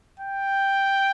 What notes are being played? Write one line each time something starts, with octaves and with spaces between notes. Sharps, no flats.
G5